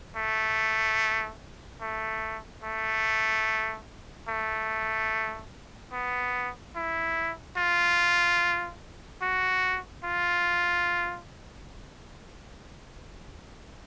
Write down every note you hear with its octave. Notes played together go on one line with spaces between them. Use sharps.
A3
A3
A3
A3
B3
E4
F4
F#4
F4